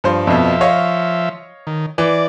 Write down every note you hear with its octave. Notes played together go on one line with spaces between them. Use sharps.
G2 F3 C5
F2 B2 F3 E5
C#5 D#5 F5
D#3
E3 D5